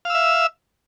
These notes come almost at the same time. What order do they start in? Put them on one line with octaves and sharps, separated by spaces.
F5 E6 E5